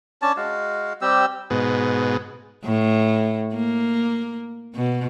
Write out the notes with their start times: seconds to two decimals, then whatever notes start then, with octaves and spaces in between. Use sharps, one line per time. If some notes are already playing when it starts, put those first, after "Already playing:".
0.22 C#4 D4 A5
0.37 G#3 F#4 F5
1.01 G3 C4 G4 E6
1.50 G#2 B2
2.64 A2
3.53 A#3
4.75 B2